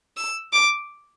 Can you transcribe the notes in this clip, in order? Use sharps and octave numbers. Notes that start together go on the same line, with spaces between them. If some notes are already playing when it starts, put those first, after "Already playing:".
E6
D6